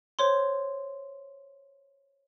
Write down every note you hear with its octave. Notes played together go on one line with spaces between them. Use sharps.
C5 C#5 C6